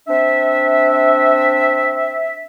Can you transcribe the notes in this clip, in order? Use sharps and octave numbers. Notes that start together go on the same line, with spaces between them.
C4 D4 E5